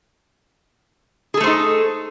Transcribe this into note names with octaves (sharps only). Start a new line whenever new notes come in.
A3 D#4 G#4 A4 C5